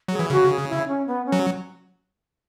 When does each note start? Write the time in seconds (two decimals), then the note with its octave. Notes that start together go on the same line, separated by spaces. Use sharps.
0.08 F#3 G#4
0.19 E3
0.30 C#3 F#4
0.50 G#4
0.69 E4
0.88 C#4
1.07 B3
1.26 C#4
1.32 F#3